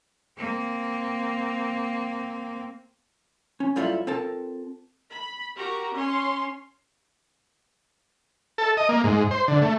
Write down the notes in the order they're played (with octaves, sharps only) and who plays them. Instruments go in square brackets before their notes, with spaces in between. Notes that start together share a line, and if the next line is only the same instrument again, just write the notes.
[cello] A#3 C4
[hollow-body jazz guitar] C#4
F#2 G3 E4 F4 A4 B5
C4 F4 A4 A#4 A5
[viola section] B5
F#4 G4 A#4 A#5
C#4 C#5 C6
[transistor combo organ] A4
D#5
A#3
G#2
C5
D3
A3